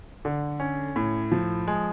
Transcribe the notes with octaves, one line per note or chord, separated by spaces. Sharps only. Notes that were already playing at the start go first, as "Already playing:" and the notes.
D3
C#4
A2
F3
G#3